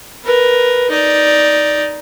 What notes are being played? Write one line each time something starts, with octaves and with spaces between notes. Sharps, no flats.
A#4 B4
D#4 D5